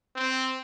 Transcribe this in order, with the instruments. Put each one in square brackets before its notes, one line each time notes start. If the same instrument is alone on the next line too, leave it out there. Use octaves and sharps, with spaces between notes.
[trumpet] C4